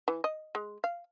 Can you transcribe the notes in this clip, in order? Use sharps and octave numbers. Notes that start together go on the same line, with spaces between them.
E3
D#5
G#3
F5